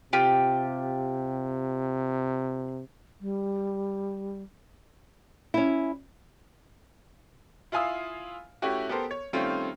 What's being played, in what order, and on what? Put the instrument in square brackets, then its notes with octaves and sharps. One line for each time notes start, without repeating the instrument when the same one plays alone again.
[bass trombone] C3 [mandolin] F4 G4
[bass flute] G3
[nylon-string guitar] C#4 E4
[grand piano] E4 F4 F5 G#5 D#6 E6
A3 C#4 E4 F#4 G4
B3 G4 A4 A#4 C5
C#5
D#3 G3 A3 C4 C#4 F4